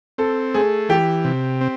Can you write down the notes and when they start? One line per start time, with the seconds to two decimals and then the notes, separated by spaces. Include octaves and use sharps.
0.18 C4 A4
0.54 A3 G#4
0.89 E3 G4
1.25 C3
1.61 C4